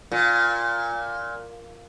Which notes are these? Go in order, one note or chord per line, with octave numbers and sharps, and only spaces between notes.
A#2